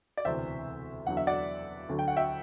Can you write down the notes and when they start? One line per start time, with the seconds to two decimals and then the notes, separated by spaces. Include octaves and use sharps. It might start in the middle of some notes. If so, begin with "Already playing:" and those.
0.17 D5
0.25 E1 D2 C3 E3 C5 E5
1.07 E2 D3 F#3 F#5
1.17 E5
1.27 D5 F#5
1.89 D2 D3 F#3
1.99 G5
2.08 F#5
2.17 E5 G5